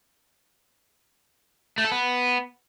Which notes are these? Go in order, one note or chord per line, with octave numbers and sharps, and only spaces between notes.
A3
A4
B3